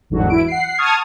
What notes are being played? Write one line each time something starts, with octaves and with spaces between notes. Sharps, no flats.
G1 E2 G#2 D3 F#3 F#4
E3 E4 D7
F#5 C7
A5 C#6 D#6 F6 G#6